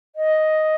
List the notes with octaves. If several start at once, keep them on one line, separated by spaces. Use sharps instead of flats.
D#5